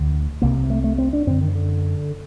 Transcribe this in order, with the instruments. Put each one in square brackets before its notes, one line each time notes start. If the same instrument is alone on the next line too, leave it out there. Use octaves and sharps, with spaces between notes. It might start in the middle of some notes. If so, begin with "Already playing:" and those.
Already playing: [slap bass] D2 D3
C2 C3 A#3
A3
A3
C4
D4
F#2 D3 C4
D#3
D3